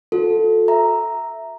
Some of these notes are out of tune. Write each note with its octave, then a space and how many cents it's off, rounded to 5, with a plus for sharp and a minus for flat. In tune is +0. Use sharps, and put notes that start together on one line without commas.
F#4 -45 A4 +0
E5 +0 A#5 +0